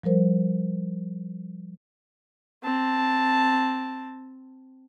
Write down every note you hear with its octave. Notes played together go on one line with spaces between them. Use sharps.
F3 G3 A#4 C5
C4 A5